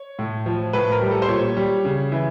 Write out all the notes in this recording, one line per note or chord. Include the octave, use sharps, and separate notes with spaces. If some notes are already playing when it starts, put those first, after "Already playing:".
Already playing: C#5
A2
F3
A2 B4
A#4
G3
A4
C5
A#2 C#5
G3
C#3
E3